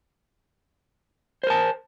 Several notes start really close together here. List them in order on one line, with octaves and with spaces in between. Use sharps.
C5 A#4 A5